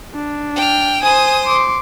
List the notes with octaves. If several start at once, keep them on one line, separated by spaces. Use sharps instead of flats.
D4
G5 F6
C5 G#5 D#6
C6 D6